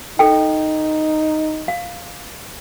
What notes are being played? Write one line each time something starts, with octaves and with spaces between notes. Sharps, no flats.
D#4 A4 G5
F5